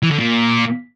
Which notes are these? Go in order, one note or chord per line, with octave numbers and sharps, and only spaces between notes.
E3
D3
A#2